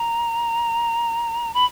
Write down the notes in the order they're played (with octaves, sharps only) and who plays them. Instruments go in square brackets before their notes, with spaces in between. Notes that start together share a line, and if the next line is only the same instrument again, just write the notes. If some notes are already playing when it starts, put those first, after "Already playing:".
Already playing: [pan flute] A#5
B5